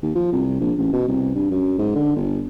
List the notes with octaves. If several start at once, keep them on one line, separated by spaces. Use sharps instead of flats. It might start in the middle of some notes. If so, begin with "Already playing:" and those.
D#2
F3
C2
A#1
A1
B2
C2
G2
F#2
G#2
D3
G1